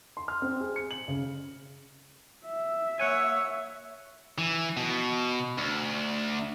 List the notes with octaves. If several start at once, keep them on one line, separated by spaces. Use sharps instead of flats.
C6
F6
C4
G#4
C#7
F#7
C#3
E5
A#3 C#5 F#5 G#5 E6
E3
B2
D2